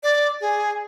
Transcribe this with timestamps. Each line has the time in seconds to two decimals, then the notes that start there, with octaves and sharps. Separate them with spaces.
0.03 D5
0.41 G#4